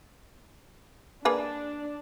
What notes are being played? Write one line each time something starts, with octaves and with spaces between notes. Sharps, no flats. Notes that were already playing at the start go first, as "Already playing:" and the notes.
A#3 D4 G#4 B4